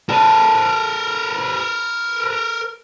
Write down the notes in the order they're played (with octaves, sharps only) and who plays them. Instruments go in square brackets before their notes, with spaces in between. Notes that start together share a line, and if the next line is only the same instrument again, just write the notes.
[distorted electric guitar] A#4 B4 [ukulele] D5 A5